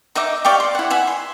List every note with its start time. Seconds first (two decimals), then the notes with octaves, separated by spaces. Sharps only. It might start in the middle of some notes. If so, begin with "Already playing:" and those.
0.15 D#4 D#5 E5 D6
0.45 G4 C#5 D5 F5
0.60 C6
0.75 E4 F#5
0.90 E5 F#5 G#5
1.07 C6